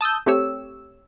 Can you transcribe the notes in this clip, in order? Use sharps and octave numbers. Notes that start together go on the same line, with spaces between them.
A5 D#6 E6 G6
A3 C4 G4 C#5 E6